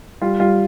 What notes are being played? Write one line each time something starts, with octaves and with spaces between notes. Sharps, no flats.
G3 F4
G3 F4